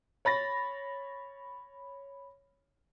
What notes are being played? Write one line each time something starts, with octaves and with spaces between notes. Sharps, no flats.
C#5 B5 A6 A#6